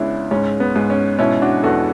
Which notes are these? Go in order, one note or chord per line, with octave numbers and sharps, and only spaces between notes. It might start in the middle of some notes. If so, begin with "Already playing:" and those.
Already playing: C#2 C#3 B3 C#4 D4 E4
G#2 C#4
B3
G#2
C#4
B2 C#4 E4
D4 F#4
E2 F#4 A4